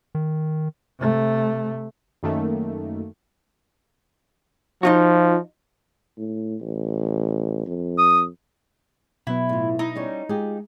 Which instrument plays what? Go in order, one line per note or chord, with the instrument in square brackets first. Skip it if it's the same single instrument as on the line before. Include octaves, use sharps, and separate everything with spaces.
[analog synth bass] D#3
[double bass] C3 A3
[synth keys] F#2 D#3 A3 A#3
[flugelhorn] F3 [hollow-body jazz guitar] D#4 F4 F#4
[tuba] A2
A1
F2
[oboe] D#6
[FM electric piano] B2 F#3 B3 [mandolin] E4
[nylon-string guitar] A2 F4
[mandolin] D#4 [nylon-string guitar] E4
[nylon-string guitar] G3 C#4 C#5
[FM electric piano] G#3 [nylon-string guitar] F4 G4 G#4